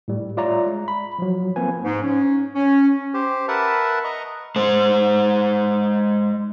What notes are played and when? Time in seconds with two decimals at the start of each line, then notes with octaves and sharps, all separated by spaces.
0.08 A2 G3
0.37 F4 C#5 D5 E5 A#5
0.66 G#3
0.88 B5
1.19 F3 F#3
1.56 F3 A#3 C4 B4 G#5
1.83 G#2
2.03 C#4
2.55 C#4
3.14 G4 C5
3.48 A#4 B4 E5 F#5 A5
4.04 D#5 A#5 C#6
4.56 G#3 C5